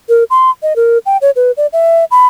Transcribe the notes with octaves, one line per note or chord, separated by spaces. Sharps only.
A#4
C6
D#5
A#4
G5
C#5
B4
D5
E5
B5